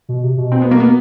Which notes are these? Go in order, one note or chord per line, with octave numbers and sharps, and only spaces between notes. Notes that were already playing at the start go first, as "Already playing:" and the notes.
B2
C3
B2
C4
B3
A#3
B3